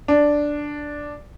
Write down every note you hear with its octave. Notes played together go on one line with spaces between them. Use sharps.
D4